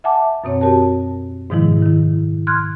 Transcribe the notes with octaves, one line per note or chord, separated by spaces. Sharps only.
E5 F#5 G#5 A5 D6
F#2 B2 C4 C#5
C4 F#4 G4 A#4 C#5 A5
G#2 B2 D#3 F3 G#3 E4
D#3 E4
C6 F6 F#6 G#6